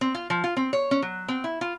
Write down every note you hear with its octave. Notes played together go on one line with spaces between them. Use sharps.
C4
F4
F3
F4
C4
C#5
C#4
F#3
C4
E4
F4